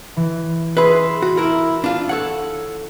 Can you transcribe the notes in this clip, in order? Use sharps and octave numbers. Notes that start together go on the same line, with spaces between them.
E3
G#4 B4 E5 B5 C6
F#4
E4 A#4
D4 F4
A4 C#5 F#5